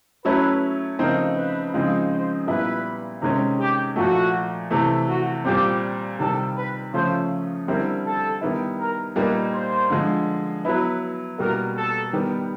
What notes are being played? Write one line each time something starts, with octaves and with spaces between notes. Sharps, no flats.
F#3 A3 C#4 E4 B4
C#3 F3 A3 C4 D#4 A#4
B4
C#3 F3 G#3 C4 D#4
C5
A#2 G3 B3 E4 B4
C3 D#3 G#3 C#4
G4
A#2 F3 A3 F#4
C3 E3 A3
F#4
A#2 G3 C4 G4
C3 D#3 G3 A4
B4
C#3 F3 A3 C#4 C5
D3 G3 C4 E4 A#4
A4
D#3 G3 B3 E4
A#4
A#2 G3 A#3 D#4 B4
C5
D3 F3 G#3
F#3 B3 E4 B4
B2 G3 A#3 A#4
A4
D#3 G3 B3